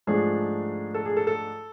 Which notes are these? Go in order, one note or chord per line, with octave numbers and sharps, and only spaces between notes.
G#2 F3 A3 D4 G#4
A4
G#4
A4
A4